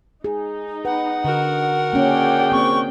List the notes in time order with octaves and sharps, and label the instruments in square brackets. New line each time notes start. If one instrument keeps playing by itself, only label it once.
[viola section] D#4 [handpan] G#4
[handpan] B4 [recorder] F#5
[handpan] D3 [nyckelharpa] F#4 A#4
[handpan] A#3 C#4 [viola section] G#4 D5 G5
[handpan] A#3 C4 [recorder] C#6